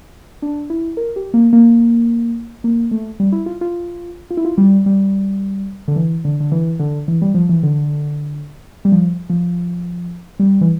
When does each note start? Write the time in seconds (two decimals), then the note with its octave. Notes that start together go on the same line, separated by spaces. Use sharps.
0.42 D4
0.70 E4
0.97 A#4
1.16 G4
1.34 A#3
1.53 A#3
2.64 A#3
2.91 A3
3.20 G3
3.32 E4
3.46 F4
3.61 F4
4.31 F4
4.37 E4
4.45 F4
4.58 G3
4.86 G3
5.88 D3
5.96 E3
6.25 D3
6.40 D3
6.52 E3
6.79 D3
7.08 E3
7.22 G3
7.34 F3
7.49 E3
7.63 D3
8.85 G3
8.92 F3
9.30 F3
10.39 G3
10.61 E3